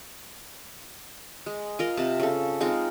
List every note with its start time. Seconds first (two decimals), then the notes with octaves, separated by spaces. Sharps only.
1.46 G#3
1.79 F4 A#4 D#5
1.97 C3 A5
2.20 C#3 A4
2.61 G#3 C4 D#4 F4